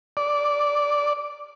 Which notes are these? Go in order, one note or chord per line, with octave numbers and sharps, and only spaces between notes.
D5